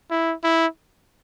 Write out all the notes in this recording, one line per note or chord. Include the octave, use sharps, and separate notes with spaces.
E4
E4